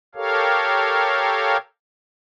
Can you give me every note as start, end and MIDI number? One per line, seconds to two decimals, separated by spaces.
0.15 1.57 67
0.15 1.57 69
0.15 1.57 70
0.15 1.57 73
0.15 1.57 77